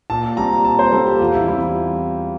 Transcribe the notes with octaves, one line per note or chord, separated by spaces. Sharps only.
A#2 A5
G3 C4 A#5
A#2 A5
C5
G3 C4 A4
G4
E2 F4
E4
E3 G3 C4 E4